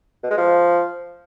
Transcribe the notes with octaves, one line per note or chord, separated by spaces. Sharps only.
B2
G#3
F3